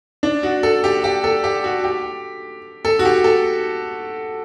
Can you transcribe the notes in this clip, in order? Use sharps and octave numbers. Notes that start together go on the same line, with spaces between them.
D4
F#4
A4
G4
G4
A4
G4
F#4
G4
A4
F#4
G4
A4